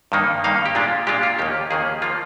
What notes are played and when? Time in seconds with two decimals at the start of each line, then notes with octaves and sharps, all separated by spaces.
0.12 G2 D#3 A#3 D#4
0.44 G2 D#3 A#3 D#4 F5
0.66 G4
0.75 A#2 G#3 D4 F4
1.07 A#2 G#3 D4 F4 G4
1.23 F4
1.39 D#2 D#3 A#3 G4
1.71 D#2 D#3 A#3 G#4
2.02 F3 A#3 F4